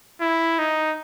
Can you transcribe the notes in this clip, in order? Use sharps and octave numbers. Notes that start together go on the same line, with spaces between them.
E4
D#4